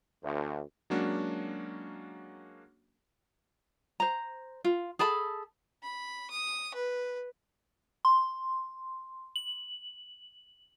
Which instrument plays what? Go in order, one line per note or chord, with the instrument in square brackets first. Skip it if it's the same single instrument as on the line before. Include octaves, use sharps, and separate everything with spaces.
[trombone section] D2
[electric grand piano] F#3 G#3 A#3 C#4 D4 F#4
[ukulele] C5 A#5
F4
G#4 A4 A5 B5
[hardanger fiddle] B5
D#6
B4
[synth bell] C6
F#7